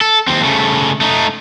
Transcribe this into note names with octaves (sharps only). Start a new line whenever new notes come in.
A4
D#2 C4
C#3 A3
A3 D#4